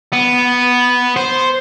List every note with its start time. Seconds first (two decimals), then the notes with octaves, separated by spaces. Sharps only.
0.13 B3
1.16 C5